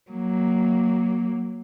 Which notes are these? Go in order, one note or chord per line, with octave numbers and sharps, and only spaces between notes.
F#3 A#3